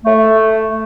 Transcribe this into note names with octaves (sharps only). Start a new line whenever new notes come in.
A3